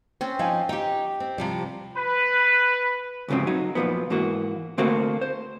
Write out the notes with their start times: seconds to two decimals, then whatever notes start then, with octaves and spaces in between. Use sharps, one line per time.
0.21 C4 C#4
0.39 F3 D#4 G#5
0.69 D#4 G4 G5
1.20 C4
1.38 C3 F3 G3
1.95 B4
3.28 D2 G#2 C#3 F3 C4
3.47 F#3 D#4
3.75 F#2 A#2 E3 F3 B3
4.10 G#2 E3 A#3 F#4
4.78 D3 A3 A#3 C4 F#4 C5
5.21 C5